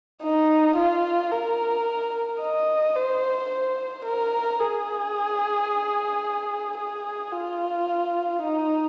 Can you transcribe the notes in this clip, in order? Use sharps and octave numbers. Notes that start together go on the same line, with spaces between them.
D#4
F4
A#4
D#5
C5
C5
A#4
G#4
G#4
F4
D#4